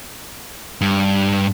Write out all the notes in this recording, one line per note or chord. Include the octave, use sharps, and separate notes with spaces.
G2